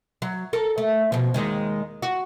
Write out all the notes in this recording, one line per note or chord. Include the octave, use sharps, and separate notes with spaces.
F#3
A4 A#4
A3
B2 F3
D#2 D#3 G#3
F#4